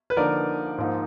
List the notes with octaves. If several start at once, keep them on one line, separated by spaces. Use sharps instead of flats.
B4
D3 F3 A#3 D#4 A#4 D5
G#2 F3 A#3 D#4